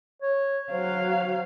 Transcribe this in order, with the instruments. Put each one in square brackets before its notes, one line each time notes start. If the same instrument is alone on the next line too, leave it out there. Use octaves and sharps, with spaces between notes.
[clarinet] C#5
[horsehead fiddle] F#3 F5 [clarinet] C5